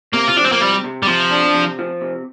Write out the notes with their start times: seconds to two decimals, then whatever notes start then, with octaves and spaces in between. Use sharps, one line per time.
0.13 C3 A#3
0.28 F4
0.37 F3 D4
0.44 C4
0.52 A#3
0.60 C3 G3
0.84 C3
1.03 G3
1.07 C3 F3
1.31 D4
1.54 C3
1.79 F3
2.01 C3